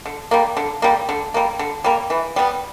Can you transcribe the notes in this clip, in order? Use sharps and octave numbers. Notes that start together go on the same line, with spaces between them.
D3
G3 A#3
D3
G3 A#3
D3
G3 A#3
D3
G3 A#3
E3
G3 B3